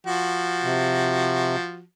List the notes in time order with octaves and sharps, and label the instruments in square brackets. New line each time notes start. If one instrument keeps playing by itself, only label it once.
[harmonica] F3 F#4
[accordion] C3